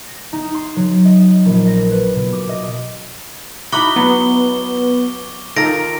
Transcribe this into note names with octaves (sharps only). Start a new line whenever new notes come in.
A#6
D#4
C6
F#3
D#5
A#1
A#6
B4
B2
D6
D#5
D#4 E4 F#4 B5 C#6 D6 G7
F#3 B3
D#3 F4 A4 A#5 A#6 D7